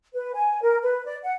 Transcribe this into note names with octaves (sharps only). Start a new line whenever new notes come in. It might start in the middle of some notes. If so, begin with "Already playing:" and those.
B4
G#5
A#4
B4
D5
F#5